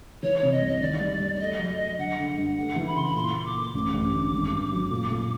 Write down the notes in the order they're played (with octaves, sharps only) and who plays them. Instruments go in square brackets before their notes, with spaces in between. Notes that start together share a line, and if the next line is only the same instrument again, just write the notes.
[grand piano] E3 [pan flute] C#5
[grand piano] C3 [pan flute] C#5
[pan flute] D#5
[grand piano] C2
[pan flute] D#5
[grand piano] D#3 [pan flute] D5
[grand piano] G3
G3
[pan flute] D5
[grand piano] A3 [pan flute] D#5
[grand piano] F#3
A3
[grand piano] D3 [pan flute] F#5
[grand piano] D3
G2
[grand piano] A3 [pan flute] F#5
[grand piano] E3
[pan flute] B5
[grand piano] C#3 [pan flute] C6
[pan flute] B5
[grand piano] A#2 [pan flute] C6
[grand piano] A#3
[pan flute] D6
[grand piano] A#3
[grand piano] A1 [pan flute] D6
[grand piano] A1
D3
G#1
G2
F#3
A#2
A#2